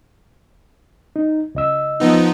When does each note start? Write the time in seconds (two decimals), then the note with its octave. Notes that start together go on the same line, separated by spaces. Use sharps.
1.16 D#4
1.55 C#2 D#5 E6
2.00 F3 B3 D#4